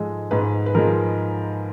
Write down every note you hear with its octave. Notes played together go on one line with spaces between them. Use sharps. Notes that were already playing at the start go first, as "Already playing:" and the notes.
Already playing: G#2 F3 G#3 A4
G#2 B4
B4
F3 G#3 A#4